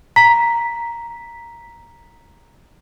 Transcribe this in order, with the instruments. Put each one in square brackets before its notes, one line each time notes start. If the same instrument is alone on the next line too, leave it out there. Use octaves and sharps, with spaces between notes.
[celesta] A#5 B6